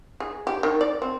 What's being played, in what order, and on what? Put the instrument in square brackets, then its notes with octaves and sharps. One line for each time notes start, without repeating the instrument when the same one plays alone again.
[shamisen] G#4
G4
D#3
D5
C4